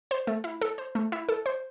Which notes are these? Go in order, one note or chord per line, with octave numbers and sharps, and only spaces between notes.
C5
A3
E4
A4
C5
A3
E4
A4
C5